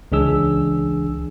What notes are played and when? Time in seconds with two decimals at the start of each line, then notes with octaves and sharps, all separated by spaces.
0.12 C#2 E3 D4 G#4 E6